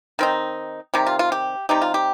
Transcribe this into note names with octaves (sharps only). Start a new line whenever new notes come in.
D#3 C4 D#4
C3 D#3 G3 G4
F4
F4
G4
C3 G3 D#4 G4
F4
G4